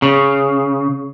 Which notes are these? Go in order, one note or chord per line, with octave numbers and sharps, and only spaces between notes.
C#3